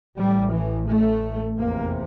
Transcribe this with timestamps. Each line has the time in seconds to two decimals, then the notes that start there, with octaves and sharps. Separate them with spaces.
0.18 A1 A2 G3
0.53 E3
0.89 A3
1.58 F1 E2 C3 A#3